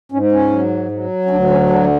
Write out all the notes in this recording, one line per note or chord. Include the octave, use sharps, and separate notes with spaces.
G#2 C#4
C#4
F#3
F#3
C#4
D2 D4
C#4
D3 D4